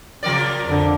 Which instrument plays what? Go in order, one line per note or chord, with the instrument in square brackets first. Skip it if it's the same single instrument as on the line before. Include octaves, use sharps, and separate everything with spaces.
[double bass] C#3 [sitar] F3 A#4 D5
[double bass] F2 D3